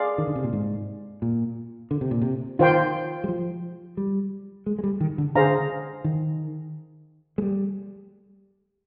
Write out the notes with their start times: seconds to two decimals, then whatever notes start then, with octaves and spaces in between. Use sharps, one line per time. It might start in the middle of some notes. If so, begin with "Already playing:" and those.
Already playing: G#4 D5 F5 C6
0.18 D#3
0.27 D3
0.36 C3
0.44 A#2
0.53 G#2
1.22 A#2
1.91 D3
2.01 C3
2.11 A#2
2.22 C3
2.59 D#3 F4 C5 G5 C6
3.24 G3
3.28 F3
3.97 G3
4.66 G#3
4.79 G#3
4.84 G3
5.00 D#3
5.18 D3
5.35 D3 G#4 C5 F5 A#5
6.04 D#3
7.38 G#3
7.42 G3